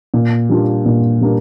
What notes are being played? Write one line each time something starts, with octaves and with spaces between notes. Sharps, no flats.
A#2
G3 A#3 D4 F4
A#2
G3 A#3 D4